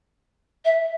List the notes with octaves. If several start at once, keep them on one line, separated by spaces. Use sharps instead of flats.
E5